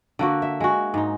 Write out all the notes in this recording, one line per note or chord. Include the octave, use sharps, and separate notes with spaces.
D3 A#3 F#4
E5
G#3 F#4
G#2 D#4